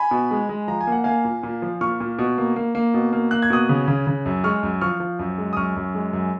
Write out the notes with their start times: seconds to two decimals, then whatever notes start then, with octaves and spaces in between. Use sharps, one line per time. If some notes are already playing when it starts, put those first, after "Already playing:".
Already playing: G#5 B5
0.11 B2
0.31 G#3
0.49 G#3
0.68 F3 A#5
0.81 G#5
0.87 A#3
0.92 F#5
1.04 A#3 F5 G#5
1.25 A#2
1.43 A#2
1.62 F3
1.81 A#2 C#6 F6
2.00 A#2
2.19 B2
2.38 A#3
2.56 A#3
2.75 A#3
2.94 B2
3.13 A#3
3.31 A#3 F#6
3.42 G#6
3.50 B2 D#6 F#6
3.69 C#3
3.88 C#3
4.07 C#3
4.26 F#2
4.44 G#3 C#6 F6
4.63 F#2
4.81 F3 C#6 F6
5.00 F3
5.19 F#2
5.38 G#3
5.53 D#6
5.56 F#2 C#6 F6
5.76 F#2
5.95 G#3
6.13 F#2